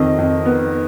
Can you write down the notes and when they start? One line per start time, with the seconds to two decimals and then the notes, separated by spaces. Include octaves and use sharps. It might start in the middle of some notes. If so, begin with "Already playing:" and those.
Already playing: F2 D#3 D#5
0.18 F2
0.45 B3